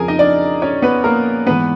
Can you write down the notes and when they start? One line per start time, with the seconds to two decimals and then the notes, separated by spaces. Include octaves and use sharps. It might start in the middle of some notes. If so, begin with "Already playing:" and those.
Already playing: F2 C#3 F3 G#4 A#4 G#5 A#5
0.08 D#4 D#5
0.19 D4 D5
0.62 C#4 C#5
0.82 B3 B4
1.04 A#3 A#4
1.47 G#2 E3 B3 B4